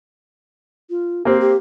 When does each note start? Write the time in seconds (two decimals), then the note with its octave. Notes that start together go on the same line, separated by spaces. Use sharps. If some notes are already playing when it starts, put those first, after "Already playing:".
0.90 F4
1.25 A#3 C4 G4
1.41 G4